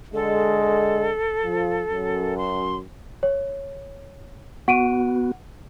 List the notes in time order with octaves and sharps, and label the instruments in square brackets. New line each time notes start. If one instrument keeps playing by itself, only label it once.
[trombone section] D3 G#3 [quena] A4
[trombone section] F3
F#2
[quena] C6
[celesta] C#5
[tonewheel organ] B3 F#4 [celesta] F#5 D7 D#7